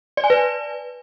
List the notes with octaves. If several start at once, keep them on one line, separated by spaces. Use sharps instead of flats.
D5
G#5
B4